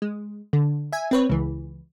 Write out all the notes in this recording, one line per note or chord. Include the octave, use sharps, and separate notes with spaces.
G#3
D3
E5 G#5
C4 B4 C#5
C#2 E3